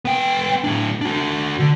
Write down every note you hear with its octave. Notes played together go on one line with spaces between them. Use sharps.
B3 G5
A2 D4
D4 F#4
D3